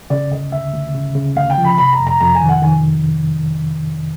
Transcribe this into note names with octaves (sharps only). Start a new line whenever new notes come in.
C#3 D5
D2 D#5
D2 E5
D2
C#3
C#3
D2 F5
G5
F3
B5
C3 B5
A#5
F2
A#5
F2 A#5
G#5
D#3
F#5
D#3 G#5